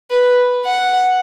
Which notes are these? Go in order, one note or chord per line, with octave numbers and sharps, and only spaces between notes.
B4
F#5